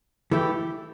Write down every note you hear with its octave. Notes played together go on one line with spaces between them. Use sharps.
E3 A3 E4 G4